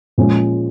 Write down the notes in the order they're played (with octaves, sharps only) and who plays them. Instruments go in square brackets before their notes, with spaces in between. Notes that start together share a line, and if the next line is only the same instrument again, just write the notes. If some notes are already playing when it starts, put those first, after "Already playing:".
[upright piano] A#2 F3 G#3 C#4 G#4